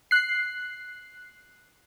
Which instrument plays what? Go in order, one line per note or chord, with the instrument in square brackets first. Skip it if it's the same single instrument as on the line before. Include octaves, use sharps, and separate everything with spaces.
[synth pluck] F#6 C7